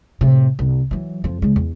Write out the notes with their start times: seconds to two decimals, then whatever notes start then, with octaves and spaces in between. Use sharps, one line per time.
0.21 A2 C3
0.59 C2
0.91 E3 F#3
1.24 F2 F3
1.42 C#3 G#3
1.56 E2